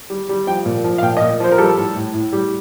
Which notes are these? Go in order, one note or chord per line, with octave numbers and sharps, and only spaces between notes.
G3
G3
F3 G5
A#2
F3
F5
A#2 G5
D#5
A#2
F3 C5
A#4
G3 A4
A2
A2
A2
G3